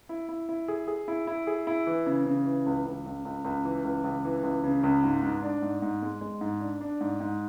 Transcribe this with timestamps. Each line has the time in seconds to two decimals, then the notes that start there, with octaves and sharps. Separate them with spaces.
0.09 E4
0.29 E4
0.49 E4
0.68 G#4
0.88 G#4
1.08 E4
1.27 E4
1.47 G#4
1.67 E4
1.87 E3
2.06 C#3
2.26 C#3
2.46 E3
2.66 C#2
2.86 C#2
3.06 C#2
3.25 C#2
3.44 C#2
3.65 E3
3.84 C#2
4.04 C#2
4.25 E3
4.43 C#2
4.64 C#3
4.83 C#2
5.04 G#2
5.23 G#2
5.43 D4
5.62 G#2
5.82 G#2
6.02 G#3
6.21 G#3
6.41 G#2
6.61 D4
6.81 D4
7.01 G#2
7.20 G#2